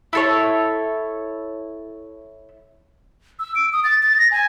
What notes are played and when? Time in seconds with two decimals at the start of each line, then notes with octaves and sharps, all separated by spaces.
0.13 E4 A4 C#5
3.39 E6
3.55 D7
3.73 D#6
3.84 A6
4.02 A6
4.18 A#6
4.31 G#5